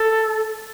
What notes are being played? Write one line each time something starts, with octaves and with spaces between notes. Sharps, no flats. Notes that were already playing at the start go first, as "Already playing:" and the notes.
Already playing: A4